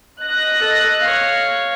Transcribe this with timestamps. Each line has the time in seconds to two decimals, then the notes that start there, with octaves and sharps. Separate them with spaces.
0.20 D#5 F#6 A#6
0.60 A4
1.01 C#5 F5